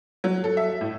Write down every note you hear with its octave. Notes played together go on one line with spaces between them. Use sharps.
F#3
A4
E5
A2